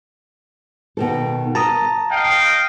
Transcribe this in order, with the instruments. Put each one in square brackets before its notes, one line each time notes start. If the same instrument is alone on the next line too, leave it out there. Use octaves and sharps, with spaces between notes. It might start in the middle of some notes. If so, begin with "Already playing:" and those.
[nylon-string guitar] B2 D#3 A4
[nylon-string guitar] A#4 [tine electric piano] A5 A#5 D#6
[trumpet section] D#5 F5 G5